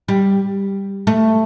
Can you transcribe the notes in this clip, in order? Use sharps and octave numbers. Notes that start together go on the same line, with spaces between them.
G3
A3